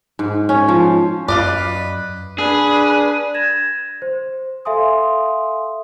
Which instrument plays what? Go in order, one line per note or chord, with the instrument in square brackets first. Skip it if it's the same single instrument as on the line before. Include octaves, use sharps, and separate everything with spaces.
[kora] G#2
C#4
F3
[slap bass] F#2 [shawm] B4 [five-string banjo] D5 D#5 F5
[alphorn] D4 [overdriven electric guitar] G#4 [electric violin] B4
[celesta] G#6 A#6 E7
C5
A4 E5 F5 G#5 C6 D#6